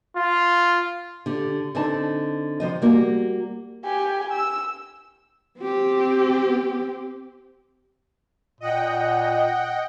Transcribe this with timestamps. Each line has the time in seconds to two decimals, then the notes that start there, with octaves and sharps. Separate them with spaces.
0.16 F4
1.26 D3 G4
1.75 D3 C4 D#4 A5
2.60 C3 F3 D#5
2.82 G3 A#3 F#4
3.85 G4 G#5
4.32 E6
5.60 C4 G4
8.60 A#2 D#5 F#5 G5